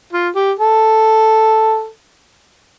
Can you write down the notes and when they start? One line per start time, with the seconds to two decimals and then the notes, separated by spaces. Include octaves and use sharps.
0.13 F4
0.35 G4
0.59 A4